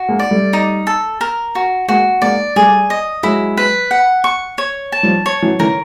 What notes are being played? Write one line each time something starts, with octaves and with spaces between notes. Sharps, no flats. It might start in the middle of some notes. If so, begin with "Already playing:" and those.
Already playing: F#4
G#3 A#3
D5
G3 A3
D#4
A4
A#4
F#4
G#3 A#3 F#4
G#3 A#3 D5
G3 A3 G#4
D#5
F#3 G#3 E4
B4
F#5
C#6
C#5
A5
F3 G3
C#5
E3 F#3
D3 E3 A#4